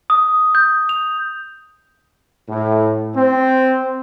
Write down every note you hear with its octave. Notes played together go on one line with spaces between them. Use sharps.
D#6
G6
F7
A2
C4